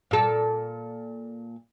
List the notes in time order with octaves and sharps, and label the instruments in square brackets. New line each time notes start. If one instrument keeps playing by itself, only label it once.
[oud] A#2 A4